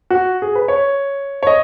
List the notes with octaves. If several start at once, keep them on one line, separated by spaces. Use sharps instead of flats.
F#4
G#4
B4
C#5
C#5
D#5